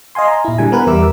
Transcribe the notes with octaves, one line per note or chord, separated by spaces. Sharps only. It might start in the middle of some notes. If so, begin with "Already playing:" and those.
D#5 F5 G#5 C6
A#5
A#2 E4
D3 G3 G#5
B3 A#4 B4
E2 G3 A#4 E5 D6 E6